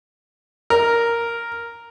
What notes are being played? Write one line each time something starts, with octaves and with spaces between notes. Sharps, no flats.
A#4